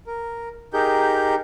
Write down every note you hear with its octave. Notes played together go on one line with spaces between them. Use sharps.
A#4
D#4 G4 G#4 A#4 G6